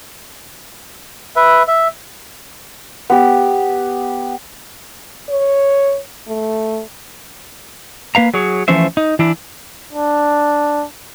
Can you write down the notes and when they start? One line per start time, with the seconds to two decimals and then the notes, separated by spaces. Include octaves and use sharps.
1.36 B4 E5
1.68 E5
3.10 B3 G4
5.29 C#5
6.28 A3
8.15 A#3 B4 F5 A#5
8.34 F#3 G#4 C#5
8.68 E3 F3 A3 C#4 C5 E5
8.97 D#4
9.19 E3 D4 E4
9.93 D4